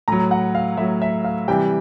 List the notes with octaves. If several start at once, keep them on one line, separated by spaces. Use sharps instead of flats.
A2 F#3 A#5
F#5
F5
A2 F#3 E5
E5
F5
C3 E3 G3 G5